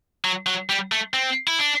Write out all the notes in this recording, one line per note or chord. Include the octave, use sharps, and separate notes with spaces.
F#3
F#3
G3
A3
C4
E4
D4